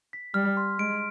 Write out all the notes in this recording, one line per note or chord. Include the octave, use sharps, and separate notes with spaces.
B6
G3 F6
C6
G#3 D7